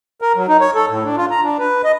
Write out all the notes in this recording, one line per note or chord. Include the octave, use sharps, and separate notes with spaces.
A#4
F#3
D#4
C#5
A4
A2
D4
F4
A#5
D4
B4
D#5